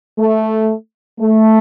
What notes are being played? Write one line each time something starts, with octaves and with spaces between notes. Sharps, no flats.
A3
A3